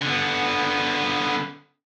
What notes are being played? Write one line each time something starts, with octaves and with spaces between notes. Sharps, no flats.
D3 B3